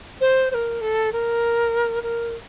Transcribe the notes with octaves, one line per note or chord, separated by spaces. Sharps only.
C5
C5
A#4
A4
A#4
A#4